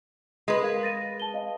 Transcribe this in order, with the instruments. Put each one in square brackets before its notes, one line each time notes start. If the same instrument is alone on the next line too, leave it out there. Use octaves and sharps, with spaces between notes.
[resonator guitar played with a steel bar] G#3 B4
[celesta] A#4 F5
A6 A#6 D#7
A5 G7
D#5 F5